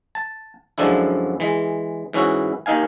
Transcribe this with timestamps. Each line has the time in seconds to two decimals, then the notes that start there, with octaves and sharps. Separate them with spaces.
0.15 A5
0.78 F#2 D3 F3 G#3 D4 E4
1.40 E3 G#3
2.13 G#2 E3 C#4 E4 F#4
2.66 D#2 D#3 D#4 F5 G#5